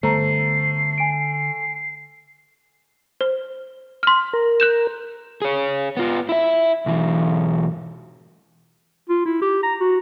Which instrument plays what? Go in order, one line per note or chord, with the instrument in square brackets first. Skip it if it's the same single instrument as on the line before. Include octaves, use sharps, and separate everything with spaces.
[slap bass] D3 G3 B3 [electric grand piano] A3 [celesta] C5 A#5 [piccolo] C7
[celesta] G#5 D7
[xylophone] C5
C6 F6
[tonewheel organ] A#4
[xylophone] F#6 G6 E7
[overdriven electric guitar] G#4 C#5
B3 F4
E4 E5
B1 E3
[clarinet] F4
E4
G4
A#5
F#4